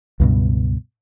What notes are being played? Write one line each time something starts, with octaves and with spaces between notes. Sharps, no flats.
C#2 G2 B2